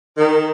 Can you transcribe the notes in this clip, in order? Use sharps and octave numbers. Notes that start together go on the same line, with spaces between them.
D#3